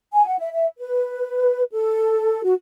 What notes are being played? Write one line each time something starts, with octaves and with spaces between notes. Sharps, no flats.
G#5
F#5
E5
E5
B4
A4
F#4